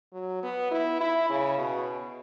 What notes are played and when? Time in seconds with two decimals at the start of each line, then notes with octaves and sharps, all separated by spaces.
0.13 F#3
0.43 B3
0.71 E4
1.01 E4
1.30 C#3
1.58 B2